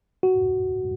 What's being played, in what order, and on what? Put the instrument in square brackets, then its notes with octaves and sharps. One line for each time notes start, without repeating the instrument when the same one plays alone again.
[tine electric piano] F#4